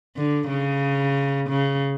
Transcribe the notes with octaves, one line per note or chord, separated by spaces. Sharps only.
D3
C#3
C#3